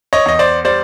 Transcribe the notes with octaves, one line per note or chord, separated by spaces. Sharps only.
C#5 D#5
E2 D#5
C5 D5
G3 C5 D5